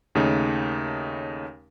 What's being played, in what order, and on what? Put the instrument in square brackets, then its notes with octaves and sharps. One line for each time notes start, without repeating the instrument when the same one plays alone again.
[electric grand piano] D#2 C#3 A3 D#4 C#5